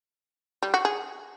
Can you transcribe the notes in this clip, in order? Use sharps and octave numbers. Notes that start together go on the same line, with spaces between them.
G3
F#4
G#4